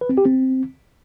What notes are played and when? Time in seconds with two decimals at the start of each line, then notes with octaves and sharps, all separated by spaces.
0.01 B4
0.09 C4
0.18 G4
0.26 C4